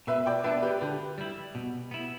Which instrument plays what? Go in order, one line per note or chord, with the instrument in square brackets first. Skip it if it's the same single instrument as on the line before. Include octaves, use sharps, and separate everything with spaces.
[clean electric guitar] B2 [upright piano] B4 E5
[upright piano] D5 G5
[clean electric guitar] B3 D4 [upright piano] B4 E5
[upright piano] G4 B4
[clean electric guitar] D3 [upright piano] G4 B4
[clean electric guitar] G3 E4
B2
B3 E4